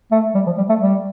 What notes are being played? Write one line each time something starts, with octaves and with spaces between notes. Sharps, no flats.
A3
G3
F3
G3
A3
G3